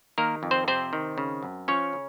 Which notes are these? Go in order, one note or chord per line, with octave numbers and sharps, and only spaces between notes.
D#3 A#3 A#4
F2
C4 C5
C3 C4 C5
D#3
C#3
F#2
F3 C#4 C#5
C#3